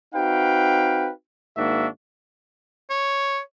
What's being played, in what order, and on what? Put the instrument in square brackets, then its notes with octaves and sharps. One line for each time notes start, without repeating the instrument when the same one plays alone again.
[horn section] C4 D#4 F#4 B4 F5 G5
G#2 D#3 A#3 D4 F#4 E5
[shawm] C#5